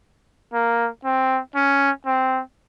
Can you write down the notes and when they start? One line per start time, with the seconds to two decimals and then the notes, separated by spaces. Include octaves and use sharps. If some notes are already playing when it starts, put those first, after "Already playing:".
0.53 A#3
1.05 C4
1.55 C#4
2.06 C4